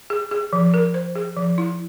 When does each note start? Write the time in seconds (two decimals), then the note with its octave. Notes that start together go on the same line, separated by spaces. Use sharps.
0.10 G#4
0.31 G#4
0.53 F3
0.74 A#4
0.94 C5
1.15 G#4
1.37 F3
1.58 E4